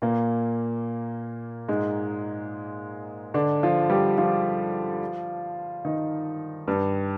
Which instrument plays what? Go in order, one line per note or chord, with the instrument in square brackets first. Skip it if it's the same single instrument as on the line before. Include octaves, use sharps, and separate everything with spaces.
[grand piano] A#2 A#3
G#2 G#3
D3 D4
F3 F4
G3 G4
F3 F4
D#3 D#4
G2 G3